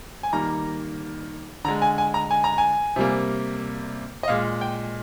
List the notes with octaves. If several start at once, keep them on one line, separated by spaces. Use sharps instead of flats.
G#5
D#3 G3 A#3 A#5
D3 G#3 A#5
G#5
G#5
A#5
G#5
A#5
G#5
C3 G3 A#3
D#5
A#2 G#3 F5
G5